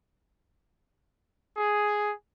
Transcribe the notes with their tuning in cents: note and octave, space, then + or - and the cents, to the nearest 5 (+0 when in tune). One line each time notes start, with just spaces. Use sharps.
G#4 +5